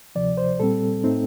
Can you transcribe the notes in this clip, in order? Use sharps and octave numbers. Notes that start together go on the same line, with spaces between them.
D2 C3 F3 D5
C5
A#2 G3 C4 A4
A2 A3 C4 D#4